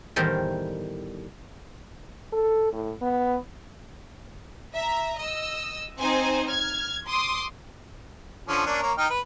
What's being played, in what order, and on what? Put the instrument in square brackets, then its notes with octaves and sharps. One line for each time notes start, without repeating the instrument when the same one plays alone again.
[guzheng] E2 A2 D#3 G3 A#4 C5
[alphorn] A4
A2
B3
[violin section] E5 A#5
D#5 E6
C4 D#4 C5 G#5
F6 G#6
C6 D6 D#6
[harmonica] D3 F3 C#4
A#3 C#4 D4
A#3 A#4 C#5
D#4 G5 F6
B4